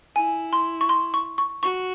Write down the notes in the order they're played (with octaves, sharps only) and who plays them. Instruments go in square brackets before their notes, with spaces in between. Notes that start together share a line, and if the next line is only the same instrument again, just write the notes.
[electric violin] E4 [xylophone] G#5
[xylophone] C6
C#6
C6
C#6
C#6
[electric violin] F#4 [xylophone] C#6